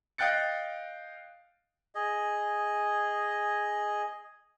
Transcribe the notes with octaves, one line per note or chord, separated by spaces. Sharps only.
D#5 F5 G5 F#6 A6 C#7
G#4 D#5